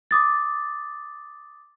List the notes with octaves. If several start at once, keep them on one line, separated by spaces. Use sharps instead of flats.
D6 D#6 A6